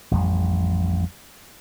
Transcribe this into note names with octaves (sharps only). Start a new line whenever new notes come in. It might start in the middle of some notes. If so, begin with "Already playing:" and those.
A1 F2 G3